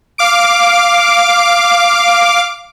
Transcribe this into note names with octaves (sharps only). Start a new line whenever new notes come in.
F5 D6 D7